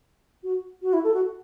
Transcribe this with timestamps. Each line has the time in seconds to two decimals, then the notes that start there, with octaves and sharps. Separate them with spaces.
0.43 F#4
0.82 F#4
0.93 E4
1.04 A4
1.14 F#4